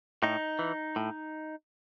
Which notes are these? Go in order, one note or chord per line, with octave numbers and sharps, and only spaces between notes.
A2 D#4
E3
A2